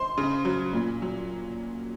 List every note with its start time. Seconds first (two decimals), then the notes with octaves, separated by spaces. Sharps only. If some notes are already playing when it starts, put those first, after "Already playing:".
Already playing: C5 C6
0.18 C#3
0.45 F#3
0.73 A#2
1.02 F#3